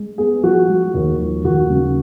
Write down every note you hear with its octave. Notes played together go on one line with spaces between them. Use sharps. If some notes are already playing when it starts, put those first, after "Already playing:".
Already playing: G#3
B3 G#4
F3 F#4
G#3
D#2
F3
D#2 F#4
C#3